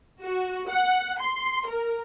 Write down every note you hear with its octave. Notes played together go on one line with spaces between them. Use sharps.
F#4
F#5
C6
A#4